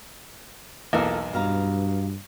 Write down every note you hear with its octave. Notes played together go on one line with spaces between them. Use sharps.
B1 E2 A#3 F4 A4 A#4
G2 B2 F5 A#5